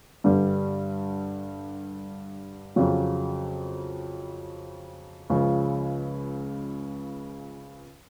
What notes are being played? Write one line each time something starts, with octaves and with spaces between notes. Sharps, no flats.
G2 D3 G3
F2 C#3 F#3
C#2 C#3 F3